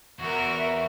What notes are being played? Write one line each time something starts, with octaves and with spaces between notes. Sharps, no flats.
E2 F#4 A#4 E5 C#6